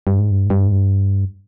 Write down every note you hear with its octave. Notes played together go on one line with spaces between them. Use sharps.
G2
G#2
G2
G#2
G2
G#2
G2